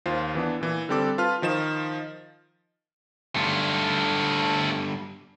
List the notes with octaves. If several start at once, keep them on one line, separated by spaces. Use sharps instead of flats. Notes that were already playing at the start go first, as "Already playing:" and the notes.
D#2 F4 C5
E3 B3 D4
A#2 E3
D3 G3 C4 A4 D6
F4 B4 A5 F6
D#3 F3 D#5 E7
G2 D3 A3 F4